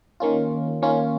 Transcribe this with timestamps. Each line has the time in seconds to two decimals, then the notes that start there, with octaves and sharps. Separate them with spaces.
0.20 D#3 A#3 C#4 F4
0.82 D#3 A#3 C#4 F4